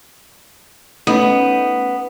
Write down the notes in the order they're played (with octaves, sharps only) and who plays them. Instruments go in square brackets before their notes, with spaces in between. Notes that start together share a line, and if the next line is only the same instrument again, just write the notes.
[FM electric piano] A3 C#4 D#4 [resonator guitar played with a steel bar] B3